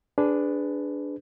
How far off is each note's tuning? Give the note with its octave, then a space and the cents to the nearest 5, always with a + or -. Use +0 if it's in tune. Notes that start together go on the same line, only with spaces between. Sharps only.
D4 -5 G#4 +0 B4 +20